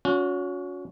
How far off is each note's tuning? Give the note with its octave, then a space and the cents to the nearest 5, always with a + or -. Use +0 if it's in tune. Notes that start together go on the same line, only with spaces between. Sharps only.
C#4 +25 F#4 -35